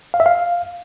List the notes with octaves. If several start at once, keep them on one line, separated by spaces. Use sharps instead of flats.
F5
E5
F5